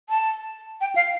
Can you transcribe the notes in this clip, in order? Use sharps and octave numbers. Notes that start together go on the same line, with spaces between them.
A5
G5
F5